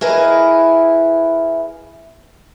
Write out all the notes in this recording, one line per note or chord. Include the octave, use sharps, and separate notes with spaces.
E4 G#4 A#4 B4 D#5